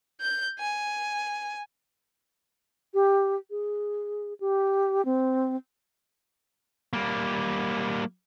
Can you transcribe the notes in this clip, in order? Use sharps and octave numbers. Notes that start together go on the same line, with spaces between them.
G6
G#5
G4
G#4
G4
C4
G3 A#3